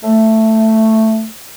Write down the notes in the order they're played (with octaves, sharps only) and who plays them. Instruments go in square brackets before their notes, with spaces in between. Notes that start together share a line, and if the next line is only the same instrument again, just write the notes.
[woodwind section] A3